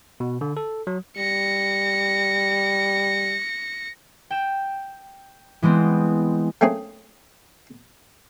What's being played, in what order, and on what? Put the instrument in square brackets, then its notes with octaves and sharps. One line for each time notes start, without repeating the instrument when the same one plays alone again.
[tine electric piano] B2
D3
A4
F#3
[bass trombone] G3 [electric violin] A#6 C#7
[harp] G5 E7
E3 G#3 B3 C4
[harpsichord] A3 A#3 C4 C#4 G#4